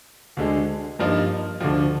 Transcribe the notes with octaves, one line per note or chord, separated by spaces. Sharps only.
D2 D3 G#3
G2 F3 A#3 D#4
D2 D3 F3